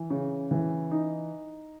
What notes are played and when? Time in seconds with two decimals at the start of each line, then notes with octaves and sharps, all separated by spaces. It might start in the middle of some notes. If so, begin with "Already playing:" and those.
Already playing: E3
0.10 C#3
0.51 E3
0.91 D#4